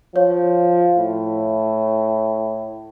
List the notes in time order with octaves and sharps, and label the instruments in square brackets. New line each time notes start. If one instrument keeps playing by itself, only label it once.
[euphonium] F3 [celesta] C#5
[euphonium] A2